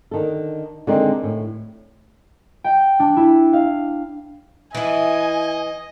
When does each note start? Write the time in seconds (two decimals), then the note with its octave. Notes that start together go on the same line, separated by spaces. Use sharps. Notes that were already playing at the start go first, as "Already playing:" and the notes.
0.11 D3 D#3 A4
0.87 D3 D#3 G#3 C4 D#4
1.23 A2
2.64 G5
3.00 D4
3.16 E4
3.53 F5
4.75 E3 E4 D#5 G#5